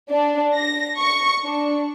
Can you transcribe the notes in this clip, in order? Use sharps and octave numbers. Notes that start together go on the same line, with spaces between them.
D4
A#6
C#6
D4